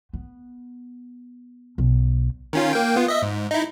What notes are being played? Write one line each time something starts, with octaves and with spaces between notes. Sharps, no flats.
B3
B1
D#3 C#4 F4
A#3 G5
B3 F4
D#5 E5
G#2
D#4 E4